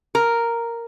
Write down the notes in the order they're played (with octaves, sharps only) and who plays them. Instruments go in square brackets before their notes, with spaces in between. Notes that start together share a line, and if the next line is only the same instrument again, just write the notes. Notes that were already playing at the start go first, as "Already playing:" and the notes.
[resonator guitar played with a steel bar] A#4